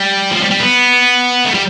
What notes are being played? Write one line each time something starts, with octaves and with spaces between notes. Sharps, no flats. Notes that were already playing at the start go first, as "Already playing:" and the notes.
Already playing: G3
F3
G3
G3
B3
A3
G3